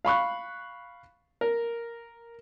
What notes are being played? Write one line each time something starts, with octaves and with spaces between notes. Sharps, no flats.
F5 B5 C#6 F#6
A#4